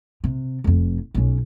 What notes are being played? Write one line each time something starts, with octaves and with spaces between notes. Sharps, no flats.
C3
F1 F2
B1 C#4